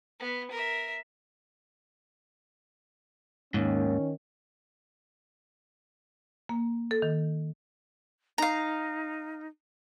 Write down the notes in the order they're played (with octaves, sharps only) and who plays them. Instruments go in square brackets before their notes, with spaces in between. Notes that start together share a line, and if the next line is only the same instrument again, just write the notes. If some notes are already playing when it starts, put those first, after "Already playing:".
[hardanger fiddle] B3
A#4 E5
[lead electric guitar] D#2 G#2 [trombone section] D#3 C#4
[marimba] A#3
A4
D#3
[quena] D#4 [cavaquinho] F5 A#5